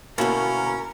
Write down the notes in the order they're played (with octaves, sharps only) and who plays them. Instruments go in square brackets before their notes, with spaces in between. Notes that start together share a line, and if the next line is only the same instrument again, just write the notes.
[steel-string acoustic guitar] D2 B2 [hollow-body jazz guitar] A#3 E4 F#4 [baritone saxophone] C#4 [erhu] A#4